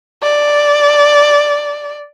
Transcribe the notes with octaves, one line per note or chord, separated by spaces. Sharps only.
D5